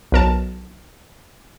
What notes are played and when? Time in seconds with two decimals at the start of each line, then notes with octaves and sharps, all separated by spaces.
0.12 B1 A#4 A5